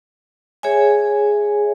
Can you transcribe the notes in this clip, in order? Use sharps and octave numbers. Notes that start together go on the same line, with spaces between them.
G#4 C#5 E5 G#5